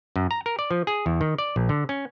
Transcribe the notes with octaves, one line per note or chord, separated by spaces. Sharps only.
F#2
A#5
A#4
D5
F3
G#4
E2
D#3
D5
A#1
D3
C#4